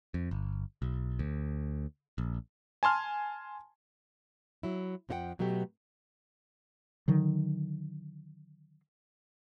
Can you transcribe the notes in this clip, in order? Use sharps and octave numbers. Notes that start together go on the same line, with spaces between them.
F2
G1
B1
D2
A#1
G#5 A5 C6 F6
F#3 E4
F2 F3 D#4 G4 F#5 G5
B2 F#3 A3 B3 G4
D3 D#3 F#3